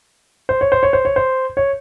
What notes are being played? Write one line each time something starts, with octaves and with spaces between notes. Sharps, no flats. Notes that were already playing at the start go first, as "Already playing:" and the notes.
C5
C#5
C5
C#5
C5
C#5
C5
C#5